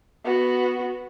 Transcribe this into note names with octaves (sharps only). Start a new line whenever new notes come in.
B3 F#4